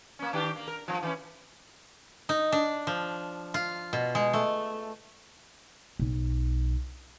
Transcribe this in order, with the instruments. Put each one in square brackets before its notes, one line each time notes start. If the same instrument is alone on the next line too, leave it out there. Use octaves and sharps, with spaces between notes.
[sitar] A#3 C#4
D#3 D4 G4
A#3
A#4
G2 D3 F3
E3 G#3 C#4
[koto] D#4
D4
F3
F4
B2
G#3
A3
[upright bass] B1